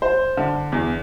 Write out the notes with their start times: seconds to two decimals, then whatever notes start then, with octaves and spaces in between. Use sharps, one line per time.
0.02 C5
0.37 D3
0.72 E2